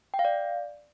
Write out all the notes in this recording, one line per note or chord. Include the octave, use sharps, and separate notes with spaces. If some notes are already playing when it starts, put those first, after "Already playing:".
G5
F5
D5